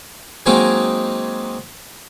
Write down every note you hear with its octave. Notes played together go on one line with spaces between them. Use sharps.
F#3 G#3 A#3 C4 D#4